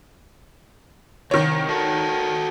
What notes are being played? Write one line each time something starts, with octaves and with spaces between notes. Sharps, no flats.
C2 D#3 C#5
F#4 A4